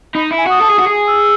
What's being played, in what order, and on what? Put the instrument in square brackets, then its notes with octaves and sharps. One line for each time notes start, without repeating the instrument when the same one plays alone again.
[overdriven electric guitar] D#4 [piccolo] B5
[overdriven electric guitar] E4
[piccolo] G#5
[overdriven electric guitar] F#4 [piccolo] D#6
[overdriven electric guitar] A4
G#4
F#4
G#4
[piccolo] E6